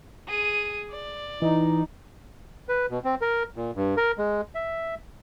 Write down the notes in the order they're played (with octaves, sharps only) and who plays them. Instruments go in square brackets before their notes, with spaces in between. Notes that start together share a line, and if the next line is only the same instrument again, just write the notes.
[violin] G#4 D#7
D5
[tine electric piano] E3 [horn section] D#4
[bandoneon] B4
B2
C4
A#4
A#2
G2
A#4
G#3
E5